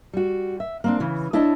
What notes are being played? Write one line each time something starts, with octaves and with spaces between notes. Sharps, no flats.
G3 F#4
E5
A#3 C4 D4
C#3 E3
D4 E4 C#5 D#5 A5